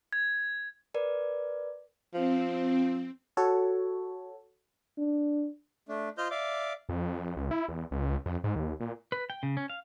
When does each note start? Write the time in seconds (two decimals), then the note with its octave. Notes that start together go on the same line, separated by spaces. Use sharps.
0.13 G#6
0.94 A#4 B4 D5
2.14 F3 C4
3.37 F#4 A4 C#5
4.98 D4
5.89 A3 D4
6.18 F4 C5 D#5 F6 G6
6.30 D5 E5 F5 D6
6.89 F2
7.36 C#2
7.51 E4
7.69 E2
7.91 C#2
8.26 F2
8.44 G#2
8.56 D#2
8.80 A#2
9.12 B4
9.30 G5
9.43 C#3
9.57 C#4
9.70 F5